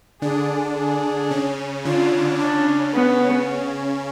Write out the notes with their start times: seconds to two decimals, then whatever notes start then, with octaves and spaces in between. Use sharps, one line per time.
0.22 D3 D4 G#4
0.77 G#4
1.31 C#3 C#4
1.85 D3 D4 F4
2.39 C#3 C#4 D4
2.94 B3